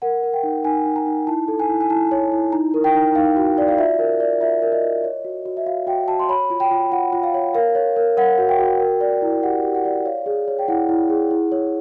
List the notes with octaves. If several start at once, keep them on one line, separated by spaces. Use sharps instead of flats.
A#4 F#5
A#4
G5
D#4
D#4 G#5
D#4
A#5
D#4
E4 A5
A4
G#5
E4
G#5
E4 A5
C#5
E4
D#4 A#5
A#4
G5
D#4
D#4 F5
F#4
D5
F5
F4 E5
A#4
D5
F4 E5
A#4
D#5
F4
C#5
F#4
F#4
E5
F#4 F5
F#4 G5
F#4 A5
C6
C#5 B5
F4
G5
F4
F4 F#5
F4
F5
C#5
A#4 F5
C#5
A#4
A#4 F#5
F#4
G5
F#4
A#4
D5
E4
G4 F#5
G4
F#5
D5
C#5 F5
G#4
C#5
G5
E4 F#5
E4
G#4
E4
C#5